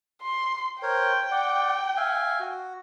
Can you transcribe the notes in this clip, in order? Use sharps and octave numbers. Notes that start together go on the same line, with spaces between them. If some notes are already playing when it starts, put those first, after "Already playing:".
C6
A#4 C5 C#5 G5
D5 F#5
E5 F5 G#5
F#4